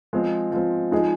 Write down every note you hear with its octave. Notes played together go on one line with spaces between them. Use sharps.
F3 G#3 C4
F3 G#3 C4
F3 G#3 D#4 G#4